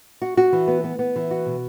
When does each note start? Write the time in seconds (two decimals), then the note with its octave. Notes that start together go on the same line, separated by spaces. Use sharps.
0.22 F#4
0.37 F#4
0.53 E3
0.68 B3
0.84 B3
0.99 B3
1.16 E3
1.31 F#4
1.46 B2